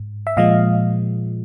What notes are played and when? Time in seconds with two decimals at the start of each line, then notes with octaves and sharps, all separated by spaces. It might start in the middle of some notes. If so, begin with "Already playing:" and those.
Already playing: G#2
0.27 E5
0.37 A#2 F3 G#3 D#5 F5